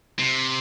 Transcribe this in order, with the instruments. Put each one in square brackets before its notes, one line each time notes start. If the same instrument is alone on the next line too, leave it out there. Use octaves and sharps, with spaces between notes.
[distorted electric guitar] C3